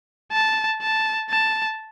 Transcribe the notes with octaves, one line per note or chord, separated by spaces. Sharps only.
A5
A5
A5